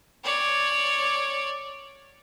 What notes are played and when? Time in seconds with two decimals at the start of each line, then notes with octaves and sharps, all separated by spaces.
0.24 C#5 D5